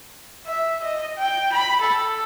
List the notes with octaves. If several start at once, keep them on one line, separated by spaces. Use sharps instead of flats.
E5
D#5
G5
B5
A4